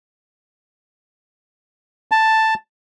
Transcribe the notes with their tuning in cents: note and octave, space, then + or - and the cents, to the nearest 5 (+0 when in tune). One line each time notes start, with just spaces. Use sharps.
A5 +5